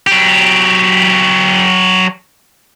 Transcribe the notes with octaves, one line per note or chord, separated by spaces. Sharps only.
F#3 G4